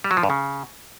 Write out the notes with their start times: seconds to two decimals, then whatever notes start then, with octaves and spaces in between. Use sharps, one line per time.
0.04 G3
0.11 F#3
0.17 F3
0.23 G2
0.30 C#3